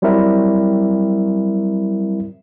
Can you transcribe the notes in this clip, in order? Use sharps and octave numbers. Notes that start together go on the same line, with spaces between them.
F#3 G3 C4 E4 A#4 E5